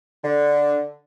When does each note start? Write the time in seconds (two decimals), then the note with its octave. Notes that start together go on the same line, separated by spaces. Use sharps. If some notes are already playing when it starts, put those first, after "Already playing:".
0.24 D3